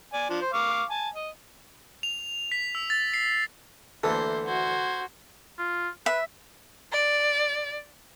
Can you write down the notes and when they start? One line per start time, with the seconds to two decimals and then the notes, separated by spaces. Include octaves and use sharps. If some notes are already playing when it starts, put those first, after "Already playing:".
0.13 D5 G#5
0.30 F3 D4
0.41 C5
0.53 F5 C#6 D6
0.90 G#5 A5
1.15 D#5
2.03 F7
2.52 B6
2.75 E6
2.90 A6
3.14 C7
4.03 D2 E3 A#3 A4 C5
4.46 F#4 C5 G#6
5.59 F4
6.06 B4 E5
6.92 D5